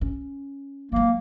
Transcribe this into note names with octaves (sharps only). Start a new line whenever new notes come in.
C#4
F#3 G#3 A#3